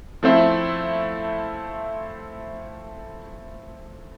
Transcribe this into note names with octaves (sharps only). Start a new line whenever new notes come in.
F3 A3 C4 E4